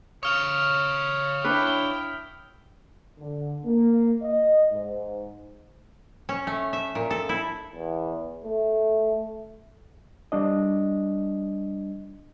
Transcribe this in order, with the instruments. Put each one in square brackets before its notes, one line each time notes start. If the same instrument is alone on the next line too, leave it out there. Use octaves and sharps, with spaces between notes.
[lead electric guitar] C#5 F5 [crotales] D#6 F6 F7
[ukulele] D4 B4 [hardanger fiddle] E4 G5
[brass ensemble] D3
A#3
D#5
G#2
[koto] C#4
A3
E5
A#2
A4
E4
[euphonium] E2
A3
[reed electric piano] G3 D4 D#5